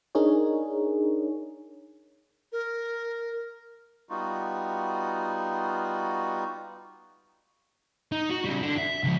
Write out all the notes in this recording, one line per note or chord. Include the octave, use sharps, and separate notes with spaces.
D4 D#4 G#4 A#4 C#5
A#4
G3 B3 D#4 F4 F#4
D#4
F#4
C#3 G3
D3
E5
C#2 F3